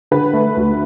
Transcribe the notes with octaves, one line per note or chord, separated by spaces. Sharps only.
D3 B4
A3
D2